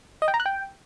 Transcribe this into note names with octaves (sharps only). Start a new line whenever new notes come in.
D#5
G5
A#5
F#6
G5